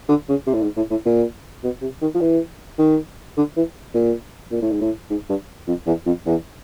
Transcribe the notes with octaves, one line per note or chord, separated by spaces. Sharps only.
D3
C#3
C3
A2
G#2
A2
A2
A#2
B2
C3
D#3
F3
E3
D#3
D3
E3
A#2
A#2
A2
G#2
A2
G#2
G2
F2
E2
F2
E2